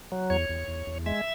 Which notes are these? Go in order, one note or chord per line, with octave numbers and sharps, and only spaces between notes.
F#3
E2 C#5
E2
E2
E2
G#3 E5